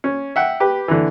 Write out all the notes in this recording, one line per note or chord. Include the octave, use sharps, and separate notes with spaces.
C#4
E5 F#5 G5
G4 B4
D3 E3